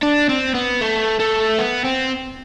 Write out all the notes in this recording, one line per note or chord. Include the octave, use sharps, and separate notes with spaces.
D4
C4
B3
A3
A3
B3
C4